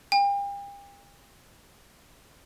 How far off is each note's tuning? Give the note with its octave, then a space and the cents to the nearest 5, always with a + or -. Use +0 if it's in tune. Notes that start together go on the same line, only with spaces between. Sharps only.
G5 +40